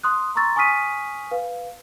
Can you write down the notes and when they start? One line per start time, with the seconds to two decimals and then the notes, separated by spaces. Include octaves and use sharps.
0.03 C6 D#6 F#6
0.35 A#5 C6 C#6 E6 A6
0.56 G#5 C#6 D#6 F6 B6 D#7
1.31 B4 F5